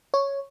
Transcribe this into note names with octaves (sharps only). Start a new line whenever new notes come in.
C#5